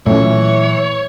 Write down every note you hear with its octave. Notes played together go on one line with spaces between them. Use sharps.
A#2 E3 F#3 A3 C#4 C#5